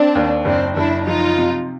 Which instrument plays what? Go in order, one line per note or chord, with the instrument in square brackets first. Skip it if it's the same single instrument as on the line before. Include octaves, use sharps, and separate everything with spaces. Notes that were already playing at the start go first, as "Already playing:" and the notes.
Already playing: [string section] C4 D4
[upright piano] D#2
[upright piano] F#1 [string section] C4 D4
[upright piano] F#1 [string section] D4 E4
[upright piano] F3 [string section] D#4 F4
[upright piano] C3